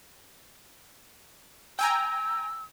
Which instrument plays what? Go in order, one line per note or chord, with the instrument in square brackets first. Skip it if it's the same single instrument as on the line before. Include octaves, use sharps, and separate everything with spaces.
[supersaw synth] G5 G#5 A#5 [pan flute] E6